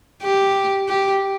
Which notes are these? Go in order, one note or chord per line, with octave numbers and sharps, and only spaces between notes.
G4
G4